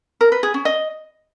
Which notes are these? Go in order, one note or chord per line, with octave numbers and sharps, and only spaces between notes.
A#4
B4
G#4
C#4
D#5